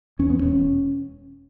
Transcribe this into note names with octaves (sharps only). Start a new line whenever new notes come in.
E2 C#4
B3
E1 C#4